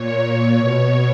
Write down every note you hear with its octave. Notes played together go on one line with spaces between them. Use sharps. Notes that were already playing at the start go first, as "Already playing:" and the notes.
Already playing: A#2 C#5
C#5
B2